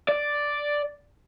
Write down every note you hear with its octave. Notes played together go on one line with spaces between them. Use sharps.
D5